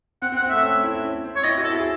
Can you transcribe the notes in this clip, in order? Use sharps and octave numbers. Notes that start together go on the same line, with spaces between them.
C4 F#5
C4
F#5
C4
A3 E5
C#4
E4
C#4
C4
C#5
E4 D#5
F#4
A4
E4
G#4